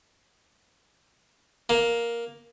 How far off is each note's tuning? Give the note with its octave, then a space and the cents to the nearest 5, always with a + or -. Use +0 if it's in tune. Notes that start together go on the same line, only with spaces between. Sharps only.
A#3 +5